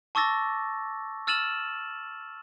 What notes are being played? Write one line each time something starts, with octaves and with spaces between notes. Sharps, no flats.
A5 C#6 D6 E6 A6 A#6
E6 F6 A6 D#7 E7 F#7